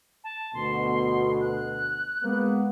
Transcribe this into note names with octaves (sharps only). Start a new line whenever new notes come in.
A5
D2 B2 C6
F#6
G#3 A#3 B3